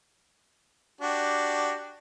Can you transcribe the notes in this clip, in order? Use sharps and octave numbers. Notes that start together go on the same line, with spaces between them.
D4 F#4 G4